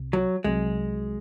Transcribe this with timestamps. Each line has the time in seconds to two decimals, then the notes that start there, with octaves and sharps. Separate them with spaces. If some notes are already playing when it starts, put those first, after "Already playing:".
Already playing: C2 C3
0.13 F#3
0.44 C2 C3 F#3 G#3